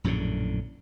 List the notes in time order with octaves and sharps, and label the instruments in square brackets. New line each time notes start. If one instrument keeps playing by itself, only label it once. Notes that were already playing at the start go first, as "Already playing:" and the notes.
[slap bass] A#1 F#2 A2 D3